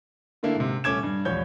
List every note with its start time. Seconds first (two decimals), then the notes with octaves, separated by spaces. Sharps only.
0.43 D3 A3 A#3 D4 E4
0.55 G#2 C3
0.84 D#1 A3 C#4 D6 G#6 E7
1.03 G2
1.25 E1 A#1 C#5 G6